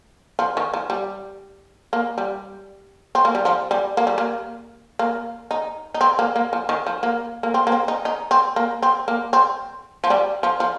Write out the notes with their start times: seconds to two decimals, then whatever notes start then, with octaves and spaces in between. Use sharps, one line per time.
0.39 F3
0.57 D#3
0.74 F3
0.90 G3
1.93 A#3
2.18 G3
3.15 C4
3.25 A#3
3.35 G3
3.45 F3
3.71 G3
3.97 A#3
4.07 G3
4.18 A#3
4.99 A#3
5.51 D#4
5.94 D#4
6.01 C4
6.19 A#3
6.36 A#3
6.53 F3
6.69 D#3
6.87 F3
7.03 A#3
7.43 A#3
7.54 C4
7.67 A#3
7.72 C4
7.88 D#4
8.05 D#4
8.31 C4
8.56 A#3
8.82 C4
9.08 A#3
9.33 C4
10.04 F3
10.10 G3
10.43 F3
10.60 F3